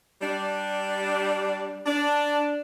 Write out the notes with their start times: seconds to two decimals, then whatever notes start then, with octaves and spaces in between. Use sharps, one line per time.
0.21 G3 D4
1.86 D4